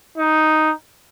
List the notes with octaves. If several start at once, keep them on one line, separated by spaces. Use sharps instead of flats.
D#4